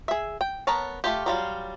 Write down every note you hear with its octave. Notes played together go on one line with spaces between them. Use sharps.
G#4 E5
G5
B3 A#4 C#5 A5
A3 F4 G4
F#3 G3 F4